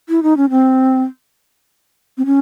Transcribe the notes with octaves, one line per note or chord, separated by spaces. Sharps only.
E4
D#4
C#4
C4
C4
C#4